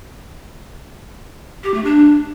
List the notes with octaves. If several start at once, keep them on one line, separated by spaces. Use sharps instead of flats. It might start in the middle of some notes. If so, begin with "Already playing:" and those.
G4
A3
D4